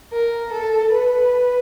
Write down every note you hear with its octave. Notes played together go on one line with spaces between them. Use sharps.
A#4
A4
B4